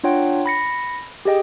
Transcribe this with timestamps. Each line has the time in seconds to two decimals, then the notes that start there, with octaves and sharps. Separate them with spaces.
0.04 D4 F4 C#5 F#5 G5
0.46 B5 A#6 C#7
1.25 G4 G#4 D#5 G5